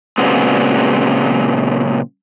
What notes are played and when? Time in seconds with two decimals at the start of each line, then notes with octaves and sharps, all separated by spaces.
0.18 A#2 C#3 F#3 G#3 B3 C4